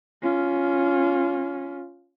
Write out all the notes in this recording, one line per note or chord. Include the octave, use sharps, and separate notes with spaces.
C#4 F4